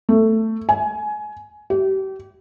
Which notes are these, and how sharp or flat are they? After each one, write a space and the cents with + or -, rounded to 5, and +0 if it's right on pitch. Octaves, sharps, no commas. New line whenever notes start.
A3 +15
G#5 +15
G4 -35